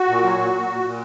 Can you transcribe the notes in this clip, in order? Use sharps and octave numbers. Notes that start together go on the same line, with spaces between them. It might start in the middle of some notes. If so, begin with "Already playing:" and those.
Already playing: F#4
A#2
F#3
A#2
A#2
A#2
A#2